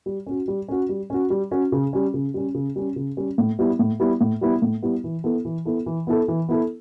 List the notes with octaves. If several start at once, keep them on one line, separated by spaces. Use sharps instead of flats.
G3
C#4 F#4
G3
C#4 F#4
G3
C#4 F#4
G3
C#4 F#4
C#3
G3 C#4
C#3
G3 C#4
C#3
G3 C#4
C#3
G3 C#4
A2
G3 B3 E4
A2
G3 B3 E4
A2
G3 B3 E4
A2
G3 B3 E4
E3
B3 E4 A4
E3
B3 E4 A4
E3
B3 E4 A4
E3
B3 E4 A4